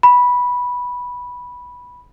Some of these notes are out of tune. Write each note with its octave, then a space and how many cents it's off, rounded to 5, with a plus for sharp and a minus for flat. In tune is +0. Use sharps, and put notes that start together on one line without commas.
B5 -10